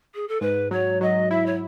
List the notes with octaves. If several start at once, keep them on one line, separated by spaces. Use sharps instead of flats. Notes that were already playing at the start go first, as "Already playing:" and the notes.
G#4
A4
G#2 B4
F#3 C#5
F#3 D#5
E4 E5
C#5